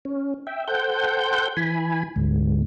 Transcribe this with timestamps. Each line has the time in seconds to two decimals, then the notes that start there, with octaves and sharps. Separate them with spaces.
0.05 C#4
0.47 E5 G5
0.67 A4 C5 F#5 G5 G6
1.57 E3 G#5 B5
2.16 D2 G#2